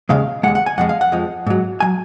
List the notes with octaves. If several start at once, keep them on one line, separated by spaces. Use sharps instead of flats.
D#2 C#3 G#3 F5
D#2 C#3 G#3 F#5
F#5
G#5
F2 F3 G#3 F#5
F5
F#5
F2 F3 G#3
G#2 F#3
F#3 G#5